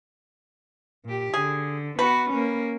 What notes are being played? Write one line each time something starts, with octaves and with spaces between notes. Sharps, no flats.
A#2 G4
D3 G#4
B3 F#4 B4
A#3 C#4